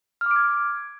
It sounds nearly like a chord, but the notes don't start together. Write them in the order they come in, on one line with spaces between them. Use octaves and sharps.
F6 D6 D7 G#6